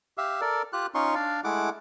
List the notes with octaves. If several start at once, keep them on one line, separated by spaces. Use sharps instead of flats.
G4 E5 F5
A4 A#4 D5
F4 G4 F#6
C#4 D#4 F4 C6 C#6
D4 D5 F5
G#3 A3 E4 F#5 D6